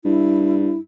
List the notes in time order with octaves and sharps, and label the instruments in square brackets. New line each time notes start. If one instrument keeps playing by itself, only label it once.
[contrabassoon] G2 [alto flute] E4